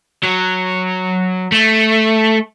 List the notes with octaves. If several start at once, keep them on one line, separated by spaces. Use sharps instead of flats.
F#3
A3